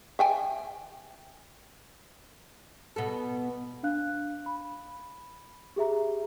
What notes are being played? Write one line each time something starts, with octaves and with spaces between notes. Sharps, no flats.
E5 G5 G#5
B2 B3 A4
D4 F5 F#6
B5
G4 G#4 E5 A#5